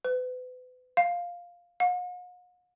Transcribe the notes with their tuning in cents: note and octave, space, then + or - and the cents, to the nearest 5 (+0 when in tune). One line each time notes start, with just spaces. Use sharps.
B4 +35
F5 +5
F#5 -45